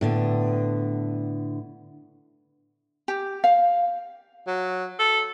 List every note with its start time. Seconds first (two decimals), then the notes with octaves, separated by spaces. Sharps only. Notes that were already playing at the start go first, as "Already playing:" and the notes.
0.01 A2 D3 B3
3.08 G4
3.44 F5
4.47 F#3
4.99 A4